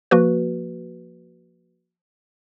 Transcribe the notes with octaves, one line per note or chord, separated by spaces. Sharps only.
F3 A#3 F#4 B4